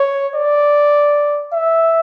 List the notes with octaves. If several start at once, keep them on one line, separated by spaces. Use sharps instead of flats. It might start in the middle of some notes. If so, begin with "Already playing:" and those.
Already playing: C#5
D5
E5